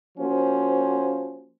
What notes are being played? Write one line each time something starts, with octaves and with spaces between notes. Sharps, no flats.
F3 A#3 C#4 F#4 C5